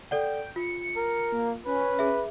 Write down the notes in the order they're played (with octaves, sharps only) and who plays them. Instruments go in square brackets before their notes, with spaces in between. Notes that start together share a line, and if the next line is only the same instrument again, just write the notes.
[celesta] A4 D5 F#5 [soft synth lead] G5
[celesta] F4 [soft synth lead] C#7
[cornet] A#4
[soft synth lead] A#3
[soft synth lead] C#4 [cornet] B4
[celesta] G#4 E5